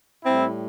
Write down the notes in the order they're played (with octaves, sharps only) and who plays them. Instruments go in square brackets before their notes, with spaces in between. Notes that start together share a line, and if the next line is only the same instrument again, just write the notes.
[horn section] A2 G3 C4 E4